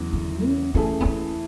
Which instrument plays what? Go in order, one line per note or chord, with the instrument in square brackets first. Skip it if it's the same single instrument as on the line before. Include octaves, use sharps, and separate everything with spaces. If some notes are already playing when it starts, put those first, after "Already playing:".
Already playing: [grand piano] E2 C#3 F#3
[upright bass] D3
C#4
[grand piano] E3 A3 E4 G#4 [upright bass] C#4
[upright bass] B3
C#4